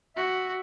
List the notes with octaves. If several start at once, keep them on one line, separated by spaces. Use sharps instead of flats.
F#4 E5